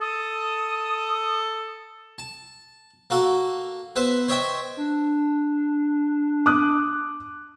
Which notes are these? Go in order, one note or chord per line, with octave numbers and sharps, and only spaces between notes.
A4 D#6
A5
A#3 F#4 A4
B3 B4 C5 E5
C5 C#5 D#5 E5 G5
D4
D6 D#6 F#6